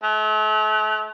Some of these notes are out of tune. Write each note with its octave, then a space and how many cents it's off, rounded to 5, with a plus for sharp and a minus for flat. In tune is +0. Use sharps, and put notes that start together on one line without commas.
A3 -40